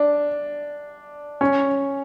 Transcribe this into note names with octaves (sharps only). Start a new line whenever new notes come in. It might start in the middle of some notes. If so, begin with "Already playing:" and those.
Already playing: D4
C#4